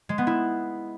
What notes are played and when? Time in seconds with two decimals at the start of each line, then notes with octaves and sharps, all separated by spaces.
0.09 G#3
0.18 B3
0.27 E4